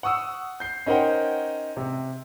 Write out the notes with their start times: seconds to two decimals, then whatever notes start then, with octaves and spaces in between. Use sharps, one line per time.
0.03 F#5 C#6 D#6 E6
0.60 G6 C7
0.86 C#4 D#4 A#4 C5 F#5 G5
1.77 C3